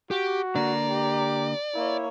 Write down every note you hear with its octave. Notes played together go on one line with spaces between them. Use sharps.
F#4 G4
D3 A#3 D5 A#5
G4
A#3 E4 C#5